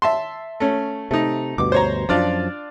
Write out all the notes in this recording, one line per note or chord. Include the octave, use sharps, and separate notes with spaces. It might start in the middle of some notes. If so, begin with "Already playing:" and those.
E5 A5 C6
A3 C#4
C3 A3 D#4
D2 G2 B2 D6
C5 C#5 A#5
F#2 F3 D4 F4 D5